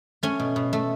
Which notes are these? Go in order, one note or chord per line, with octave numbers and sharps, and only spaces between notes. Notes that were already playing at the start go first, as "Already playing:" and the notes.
A3 C#4
B2
B2
A3